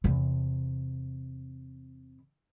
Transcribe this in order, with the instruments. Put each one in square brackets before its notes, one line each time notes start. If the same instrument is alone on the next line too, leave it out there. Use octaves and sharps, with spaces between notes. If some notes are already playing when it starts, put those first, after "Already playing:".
[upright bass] E2 C3